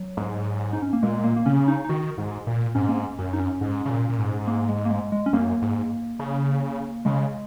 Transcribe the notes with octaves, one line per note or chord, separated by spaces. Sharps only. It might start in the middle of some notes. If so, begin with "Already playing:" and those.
Already playing: F#3
G#2
D#4
C#4
A#3
A#2 G#3
A#3
A#3
C#3 C#4
D#4
D#4
D#3 F#4
G#2
A#2
G#2 C#4
A#3
C#4
F#2 C#4
D#4
C#4
G#2
C#3
A#2
A#2
G#2
A#3
G#3
A#3
G#3
G#3
C#4
F#2 A#3
G#2
C#3
C#3 G#3